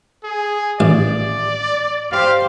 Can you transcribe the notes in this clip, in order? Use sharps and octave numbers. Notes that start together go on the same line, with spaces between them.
G#4
A1 D5
G4 C5 F5